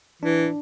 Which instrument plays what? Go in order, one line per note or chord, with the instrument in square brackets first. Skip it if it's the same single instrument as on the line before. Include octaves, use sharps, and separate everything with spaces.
[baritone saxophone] E3 [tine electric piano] D4